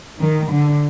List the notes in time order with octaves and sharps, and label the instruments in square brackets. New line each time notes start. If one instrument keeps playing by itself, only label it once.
[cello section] D#3
D3